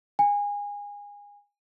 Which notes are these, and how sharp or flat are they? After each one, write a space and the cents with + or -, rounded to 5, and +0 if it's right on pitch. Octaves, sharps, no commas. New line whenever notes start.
G#5 -25